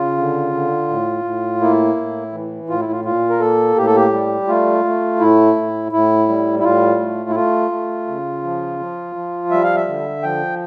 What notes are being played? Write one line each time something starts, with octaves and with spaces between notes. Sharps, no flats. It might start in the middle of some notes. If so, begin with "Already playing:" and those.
Already playing: C#3 F4
D3
D3
A2
A2
A#3 E4
A2
E3
A2 F4
E4
F4
A#2 F4
A#4
A#3 A4
A2 G4
A4
G4
G3
A3 F4
A3
A2 E4
A2
A2 E4
G3
E4
A2 F4
A3
E4
A3 F4
A3
C#3
F3
F3
F3
G3 E5
F5
E5
D3
F3 G5